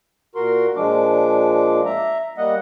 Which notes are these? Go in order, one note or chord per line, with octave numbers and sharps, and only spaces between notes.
A#2 F#4 A#4 C6
A#2 F3 G#3 D4 D6
E5 A#5
G3 A#3 D#5 F#5